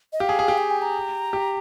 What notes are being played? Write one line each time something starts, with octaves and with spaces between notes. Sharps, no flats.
D#5
G4 F5
G#4
G#4
G4
G5
G#5
A#5
G4